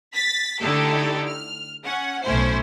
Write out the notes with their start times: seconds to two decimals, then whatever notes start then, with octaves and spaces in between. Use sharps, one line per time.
0.14 A6 B6
0.60 D3 A3 D#4 E4 G4 A4
1.27 F6
1.85 C#4 F#5
2.23 B1 A2 A3 C#4 E4 C5